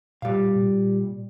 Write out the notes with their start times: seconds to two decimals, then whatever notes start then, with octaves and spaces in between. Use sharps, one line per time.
0.22 A#2 G3 F5
0.56 A#2